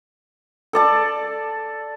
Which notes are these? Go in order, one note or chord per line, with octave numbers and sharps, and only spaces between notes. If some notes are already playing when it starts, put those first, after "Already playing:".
A4 D5 A5